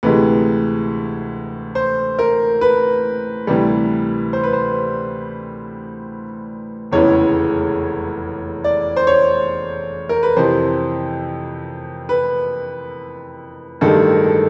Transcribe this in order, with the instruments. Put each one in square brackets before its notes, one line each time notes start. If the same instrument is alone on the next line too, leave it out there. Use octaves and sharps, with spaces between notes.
[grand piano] D2 C3 E3 G#3 B4
C5
A#4
B4
D2 C3 E3 G3
C5
B4
C5
F1 E2 C#3 E3 G#3 C#5
D5
C5
C#5
A#4
B4
F2 C3 E3 C5
B4
A1 G2 D#3 G#3 A4
A4